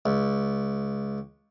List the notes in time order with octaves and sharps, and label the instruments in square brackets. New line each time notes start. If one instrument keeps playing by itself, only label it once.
[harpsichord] C#2